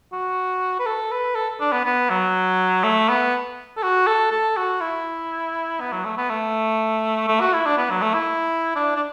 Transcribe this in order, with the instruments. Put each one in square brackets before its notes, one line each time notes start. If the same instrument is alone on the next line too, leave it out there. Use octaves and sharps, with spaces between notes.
[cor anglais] F#4
B4
A4
B4
A4
D4
B3
B3
F#3
A3
B3
A4
F#4
A4
A4
F#4
E4
B3
F#3
A3
B3
A3
A3
F#4
E4
D4
B3
F#3
A3
E4
D4
D4